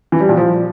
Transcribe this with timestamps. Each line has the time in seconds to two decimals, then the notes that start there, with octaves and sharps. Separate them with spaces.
0.12 E3
0.21 G3
0.29 A#2
0.37 F3